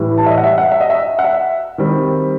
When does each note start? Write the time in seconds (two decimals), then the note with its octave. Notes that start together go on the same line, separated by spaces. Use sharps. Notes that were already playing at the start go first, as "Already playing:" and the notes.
Already playing: A2 E3 G3
0.18 A5
0.26 E5
0.30 D#5
0.37 F#5
0.44 E5
0.58 F#5
0.72 E5
0.81 D#5
0.90 E5
1.19 F#5
1.24 E5
1.78 D#3 G3 C4